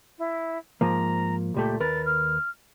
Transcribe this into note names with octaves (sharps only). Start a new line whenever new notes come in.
E4
G#2 F3 A#3 A#5
C#2 A#2 A3 G4
D#2 A#4 B4 A6
F6